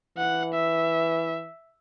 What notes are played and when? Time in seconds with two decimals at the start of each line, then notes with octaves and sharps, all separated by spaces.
0.17 E3 F#5
0.54 E5